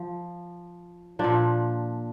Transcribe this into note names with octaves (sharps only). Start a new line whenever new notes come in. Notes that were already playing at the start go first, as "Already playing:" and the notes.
Already playing: F3
A#2 F3 D4